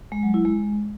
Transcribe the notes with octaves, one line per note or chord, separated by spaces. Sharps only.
G#3
F#3
E4
G#3